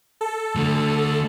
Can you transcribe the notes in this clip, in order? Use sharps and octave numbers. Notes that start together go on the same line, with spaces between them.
A4
D2 D3